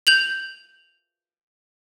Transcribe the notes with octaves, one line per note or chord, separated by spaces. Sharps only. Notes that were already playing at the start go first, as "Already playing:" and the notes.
G6 F7 F#7